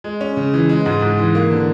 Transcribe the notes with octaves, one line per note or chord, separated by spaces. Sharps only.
G#3
C#4
C#3
E3
G#3
G#2
G#2
E3
A#3
D3